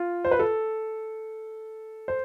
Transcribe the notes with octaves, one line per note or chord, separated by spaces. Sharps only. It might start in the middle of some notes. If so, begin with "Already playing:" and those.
Already playing: F4
C5
B4
A4
C5